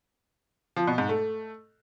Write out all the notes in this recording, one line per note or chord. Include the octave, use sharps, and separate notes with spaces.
F3
B2
G#2
A3